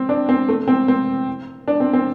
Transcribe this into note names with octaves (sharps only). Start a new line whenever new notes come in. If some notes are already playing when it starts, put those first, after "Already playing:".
Already playing: C4
D4
C4
A3
C4
C4
D4
C4
C4